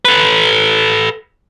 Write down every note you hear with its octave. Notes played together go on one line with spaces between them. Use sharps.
A4 B4